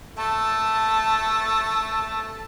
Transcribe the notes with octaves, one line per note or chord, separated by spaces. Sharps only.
A3 A5